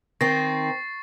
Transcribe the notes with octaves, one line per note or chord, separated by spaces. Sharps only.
D#3 C4 C#6 A6 A#6 C7